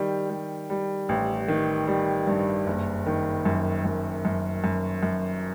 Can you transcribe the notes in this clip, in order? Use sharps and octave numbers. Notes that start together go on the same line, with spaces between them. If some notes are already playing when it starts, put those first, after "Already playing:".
Already playing: D#3 G3
G3
G3
A1
D#3
G3
G2
F#1
D#3
F#2
F#2
F#2
F#2
F#2